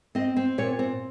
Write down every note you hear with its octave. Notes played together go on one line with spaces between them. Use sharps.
C4 D#5
C4
A#2 C#5
C4